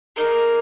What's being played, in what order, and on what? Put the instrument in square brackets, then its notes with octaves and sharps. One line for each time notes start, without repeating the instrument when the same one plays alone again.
[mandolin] A#3 D#4 G#4 A#4